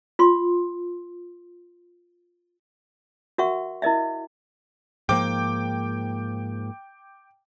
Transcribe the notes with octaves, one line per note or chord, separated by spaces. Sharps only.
F4 C6
F#4 A#4 E5 F#5 C#6
E4 A#4 D#5 E5
G#2 F3 A#3 G5 D6